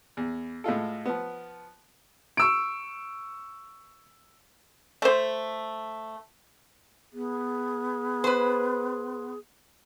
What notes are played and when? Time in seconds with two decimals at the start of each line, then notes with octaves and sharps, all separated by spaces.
0.17 E2
0.64 A2 G#3 F4 A4
1.05 F3 B3
2.37 C#6 E6 D7
5.02 A3 C5
7.13 B3 G#4
8.24 B4 C5